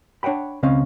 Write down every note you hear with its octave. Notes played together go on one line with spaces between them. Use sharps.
D4 C#5 F#5 G5 B5
C#2 C#3 C4 C#4 D#5 F5